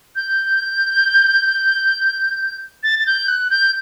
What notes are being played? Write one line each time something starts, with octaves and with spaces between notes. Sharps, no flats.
G6
A6
A6
G6
F#6
G6